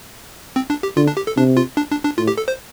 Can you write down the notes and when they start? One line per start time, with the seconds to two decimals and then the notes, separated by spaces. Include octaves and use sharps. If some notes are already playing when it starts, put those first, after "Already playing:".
0.56 C4
0.70 D4
0.83 G4
0.96 D3 F4
1.07 D4
1.17 G4
1.27 A4
1.36 C3 D4
1.57 F4
1.77 D4
1.91 D4
2.05 D4
2.18 A2 F4
2.28 G4
2.38 A4
2.48 C5